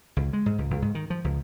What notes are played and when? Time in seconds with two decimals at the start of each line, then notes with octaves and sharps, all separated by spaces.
0.17 C#2
0.33 G#3
0.46 G#2
0.58 C#2
0.70 C#2
0.82 G#2
0.95 D#3
1.10 F3
1.24 C#2